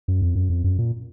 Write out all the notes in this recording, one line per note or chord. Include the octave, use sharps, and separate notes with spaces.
F#2
F2
F#2
F2
F#2
A#2